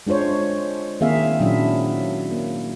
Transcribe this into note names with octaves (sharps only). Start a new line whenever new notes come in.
G#3 D4 F4 C5 C#5
D#3 A#3 C4 G#4 E5 F5
A#2 F#3 C#4 D4 E4 E5
A#3